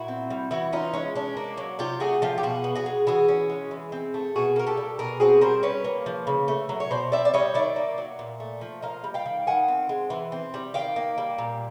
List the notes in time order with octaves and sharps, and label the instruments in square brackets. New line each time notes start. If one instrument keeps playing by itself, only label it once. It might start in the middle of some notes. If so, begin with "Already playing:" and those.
Already playing: [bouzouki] A#2 E4 F#4
C4
G3
E3 E4 F#4
C#4 D#4 F4
G#3 C#4
C#4 D4
A#3
F#3
C3 F4 G4
A3 F#4 G#4
F3 F4 G4
G4
B2 F#4 G#4
B3
F#4 G#4
G#3
E3 F#4 G#4
C#4
G#3
E3
C4
A3
B2 F#4 G#4
A#3 A#4
G4 A4
G3
B2 G#4 A#4
C4 F#4 G#4
G3 A#4 C5
C#4 B4 C#5
A#3
F3
C#3
A3
F#3
C#5
B2 C5 D5
C4 D5 E5
D5
G3 C#5 D#5
D#3 D5 E5
A#3
F#3
A#2
A3
F3
A#3 D#5 F5
G3
F5 G5
D#3
D#3 F#5 G#5
C4
G#3
E3
C4
G3
D#3 F5 G5
A#3
G3
A#2